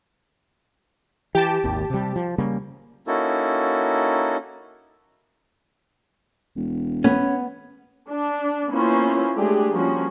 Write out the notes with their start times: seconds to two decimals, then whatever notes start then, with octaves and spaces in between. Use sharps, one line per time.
1.35 E3 G4 A5
1.64 G#1 D#2
1.90 C3 G3
2.16 F3
2.38 C#3 G3 A#3
3.07 A#3 C#4 D#4 E4 F#4 A4
6.56 E1
7.04 B3 C#4
8.08 D4
8.70 A#3 B3 C#4 E4 F4 C5
9.37 G#3 A3 D4 G4 G#4 D5
9.73 F3 G3 A#3 C#4 F#4